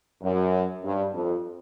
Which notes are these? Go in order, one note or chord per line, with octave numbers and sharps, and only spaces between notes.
F#2
G2
F2